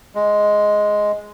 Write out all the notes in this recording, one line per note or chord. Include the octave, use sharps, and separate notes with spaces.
G#3